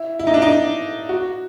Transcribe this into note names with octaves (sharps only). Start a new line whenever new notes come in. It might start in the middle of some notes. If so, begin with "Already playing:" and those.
Already playing: E4
E4
D#4
D4
D#4
F#4